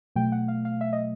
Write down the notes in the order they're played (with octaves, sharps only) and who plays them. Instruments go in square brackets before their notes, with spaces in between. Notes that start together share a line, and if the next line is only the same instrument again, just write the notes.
[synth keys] B2 F#3 A3 G5
F#5
F5
F5
E5
D#5